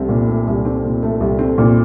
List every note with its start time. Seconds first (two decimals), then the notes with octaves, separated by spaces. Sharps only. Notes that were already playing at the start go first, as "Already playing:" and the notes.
Already playing: C2 A3 C4
0.09 A#2
0.28 A3
0.47 C2
0.65 C4
0.84 A#2
1.03 A3
1.20 C2
1.39 C4
1.58 A#2